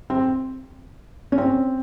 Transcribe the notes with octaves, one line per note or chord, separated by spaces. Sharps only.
C4
C#4
C4